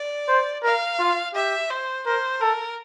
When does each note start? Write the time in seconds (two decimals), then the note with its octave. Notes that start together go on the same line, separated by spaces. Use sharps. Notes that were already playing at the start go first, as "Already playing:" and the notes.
Already playing: D5
0.28 C5
0.63 A#4 F5
0.99 F4
1.34 G4 E5
1.70 C5
2.06 A#4 C5
2.41 A4 A#4